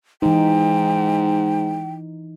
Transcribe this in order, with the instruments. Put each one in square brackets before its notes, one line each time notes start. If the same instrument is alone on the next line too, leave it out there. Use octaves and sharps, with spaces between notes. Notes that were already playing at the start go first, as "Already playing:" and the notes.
[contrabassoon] G#2 [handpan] E3 D#4 [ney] G5